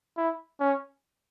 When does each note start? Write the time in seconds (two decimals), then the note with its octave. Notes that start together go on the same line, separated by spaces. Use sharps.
0.17 E4
0.60 C#4